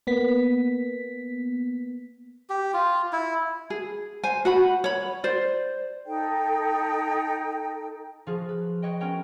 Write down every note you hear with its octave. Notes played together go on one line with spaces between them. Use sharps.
A#3 B3 B6
G4
F4
E4
G#4
C5 G#5
F#4 F#5 B5
C#5 B5
C5 D5
D#4 A4 G5
F3 F4 F#4 G#4
B4
B4 C#5 D#5 G5
B3 C#4 F#4 A#4 C#5 G5